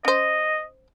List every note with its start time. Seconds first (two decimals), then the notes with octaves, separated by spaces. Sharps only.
0.05 C#4 C5 D#5